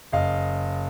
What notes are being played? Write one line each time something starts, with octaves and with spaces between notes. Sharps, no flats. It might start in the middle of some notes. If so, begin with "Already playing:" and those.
F#1 D#5 F5